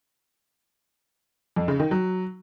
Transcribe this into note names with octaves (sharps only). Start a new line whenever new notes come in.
F2
C#3
D#3
F#3